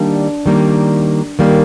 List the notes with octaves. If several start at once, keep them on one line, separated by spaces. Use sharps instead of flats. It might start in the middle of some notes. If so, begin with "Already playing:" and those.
Already playing: D#3 G3 A#3 D4
D#3 G3 A#3
D#3 G3 A#3